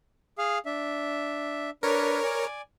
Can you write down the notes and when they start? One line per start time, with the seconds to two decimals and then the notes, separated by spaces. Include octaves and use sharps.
0.38 G#4 F5
0.66 D4 E5
1.83 D4 A#4 B4 C#5
2.24 D5 G#5